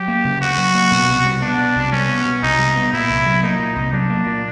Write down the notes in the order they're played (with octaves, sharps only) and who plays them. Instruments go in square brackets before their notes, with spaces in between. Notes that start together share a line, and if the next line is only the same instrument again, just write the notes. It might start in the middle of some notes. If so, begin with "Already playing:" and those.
Already playing: [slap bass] F#3 [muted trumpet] G4
[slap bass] A#3
C#3
[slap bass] D2 [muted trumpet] F#4
[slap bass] F#3
A#3
B2
C2
G3
[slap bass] B3 [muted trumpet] D4
[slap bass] B2
C2
[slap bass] G3 [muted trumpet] C#4
[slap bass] B3
B2
[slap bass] C2 [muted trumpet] D#4
[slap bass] G3
B3
[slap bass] A#2 [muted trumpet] E4
[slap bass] C2
F#3
[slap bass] A#3 [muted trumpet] D#4
[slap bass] A#2
C2
[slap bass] F#3 [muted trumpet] D4
[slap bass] A#3
A#2